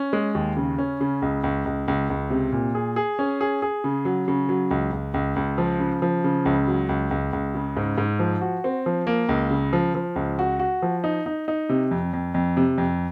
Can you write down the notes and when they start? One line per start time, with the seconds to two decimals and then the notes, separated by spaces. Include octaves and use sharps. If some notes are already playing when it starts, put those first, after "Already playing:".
Already playing: C#4
0.13 G#3
0.35 D#2
0.57 C#3
0.78 C#4
1.01 C#3
1.22 C#2
1.44 C#2
1.66 C#2
1.88 C#2
2.10 C#2
2.30 C3
2.52 A#2
2.75 G#4
2.96 G#4
3.19 C#4
3.41 G#4
3.62 G#4
3.84 C#3
4.05 F#3
4.28 C#3
4.49 F#3
4.71 C#2
4.93 C#2
5.14 C#2
5.36 C#2
5.58 F3
5.79 C#3
6.02 F3
6.24 C#3
6.46 C#2
6.67 F#3
6.89 C#2
7.11 C#2
7.33 C#2
7.55 C#3
7.77 G#2
7.98 G#2
8.19 F3
8.41 F#4
8.64 C4
8.86 F3
9.07 A#3
9.29 C#2
9.51 C#3
9.73 F3
9.95 F3
10.16 C#2
10.39 F#4
10.59 F#4
10.82 F3
11.04 D#4
11.26 D#4
11.48 D#4
11.69 C3
11.91 F2
12.13 F2
12.34 F2
12.57 C3
12.78 F2